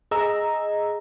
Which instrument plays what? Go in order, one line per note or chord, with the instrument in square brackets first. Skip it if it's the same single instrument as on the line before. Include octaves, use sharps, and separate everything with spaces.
[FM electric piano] G#4 D#5 A#5 E6